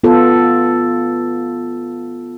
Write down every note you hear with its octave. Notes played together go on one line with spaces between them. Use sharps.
B3 F4 A4